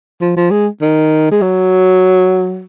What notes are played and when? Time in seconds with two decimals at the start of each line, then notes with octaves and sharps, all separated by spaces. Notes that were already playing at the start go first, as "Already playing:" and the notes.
0.21 F3
0.36 F3
0.51 G#3
0.81 D#3
1.31 G#3
1.42 F#3